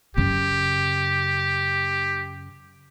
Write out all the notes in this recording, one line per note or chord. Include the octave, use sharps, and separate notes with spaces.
F#2 C#3 G4